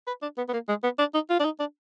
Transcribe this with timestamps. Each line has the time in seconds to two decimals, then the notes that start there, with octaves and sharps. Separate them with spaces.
0.07 B4
0.22 D4
0.38 B3
0.49 B3
0.53 A#3
0.69 G#3
0.84 B3
0.99 D4
1.14 D#4
1.30 F4
1.40 D4
1.45 D#4
1.60 D4